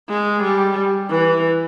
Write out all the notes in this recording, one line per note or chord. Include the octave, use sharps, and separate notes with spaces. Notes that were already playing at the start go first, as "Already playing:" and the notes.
G#3
G3
E3